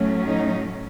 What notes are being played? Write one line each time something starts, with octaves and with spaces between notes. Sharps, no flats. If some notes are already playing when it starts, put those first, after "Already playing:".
Already playing: A2 F#3 A3 C#4
D#4